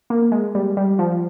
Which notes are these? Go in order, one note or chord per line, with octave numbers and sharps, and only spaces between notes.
A#3
G#3
G3
G3
F3